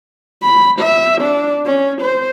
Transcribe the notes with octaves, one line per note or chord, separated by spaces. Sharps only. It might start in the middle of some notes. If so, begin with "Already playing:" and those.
B5
E5
D4
C#4
C5